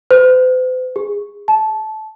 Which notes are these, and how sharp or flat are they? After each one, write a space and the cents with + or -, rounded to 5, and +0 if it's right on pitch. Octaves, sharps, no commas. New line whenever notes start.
C5 -45
G#4 -20
A5 -15